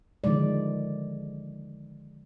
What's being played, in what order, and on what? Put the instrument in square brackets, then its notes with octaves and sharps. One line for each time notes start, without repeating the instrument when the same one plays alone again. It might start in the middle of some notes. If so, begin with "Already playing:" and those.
[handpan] D3 D#3 F3 G#3 D5